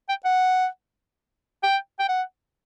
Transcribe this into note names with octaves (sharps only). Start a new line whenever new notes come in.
G5
F#5
G5
G5
F#5